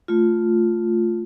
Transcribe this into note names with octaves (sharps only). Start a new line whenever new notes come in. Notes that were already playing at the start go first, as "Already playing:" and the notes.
A3 F4